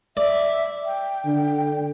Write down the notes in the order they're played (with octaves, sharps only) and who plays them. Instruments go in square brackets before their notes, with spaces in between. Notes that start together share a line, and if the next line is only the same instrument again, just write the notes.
[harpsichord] D5 [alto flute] E5
[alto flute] G5
[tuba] D3